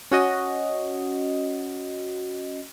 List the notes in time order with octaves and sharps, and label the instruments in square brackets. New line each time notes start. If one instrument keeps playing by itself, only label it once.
[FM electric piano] C#4 F#4 D#5